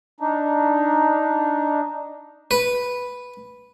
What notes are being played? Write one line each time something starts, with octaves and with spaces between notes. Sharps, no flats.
D4 D#4
B4